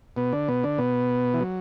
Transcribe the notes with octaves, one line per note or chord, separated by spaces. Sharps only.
B2 B3
D3 D4
B2 B3
D3 D4
B2 B3
E3
F#3